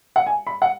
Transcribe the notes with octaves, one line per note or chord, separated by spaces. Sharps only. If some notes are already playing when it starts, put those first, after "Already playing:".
F#5
G#5
B5
F#5